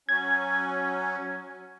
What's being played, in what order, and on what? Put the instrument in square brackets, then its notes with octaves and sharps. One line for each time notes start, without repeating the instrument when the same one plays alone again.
[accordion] F#3 C#4 [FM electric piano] G#6